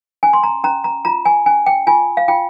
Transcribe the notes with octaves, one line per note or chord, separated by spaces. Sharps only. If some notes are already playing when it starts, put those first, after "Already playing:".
C#4 G#5
C6
A#5
C#4 A#5
A#5
F4 A#5
G#5
C#4 G#5
G5
F4 G#5
F5
F4 G5